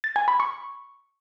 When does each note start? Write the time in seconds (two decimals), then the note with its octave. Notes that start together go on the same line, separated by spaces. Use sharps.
0.04 A6
0.16 G#5
0.28 B5
0.40 C#6